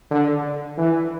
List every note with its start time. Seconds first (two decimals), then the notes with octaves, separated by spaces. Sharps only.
0.11 D3
0.78 E3